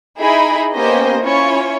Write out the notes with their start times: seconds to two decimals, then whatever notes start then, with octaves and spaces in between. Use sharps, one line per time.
0.19 D#4 E4 G#4 B5
0.73 A#3 B3 C#4 G4 C5 D#5
1.20 C#4 E4 F4 C#5